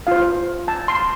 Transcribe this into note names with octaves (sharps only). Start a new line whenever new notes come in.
F4 C5 F5
A5
C6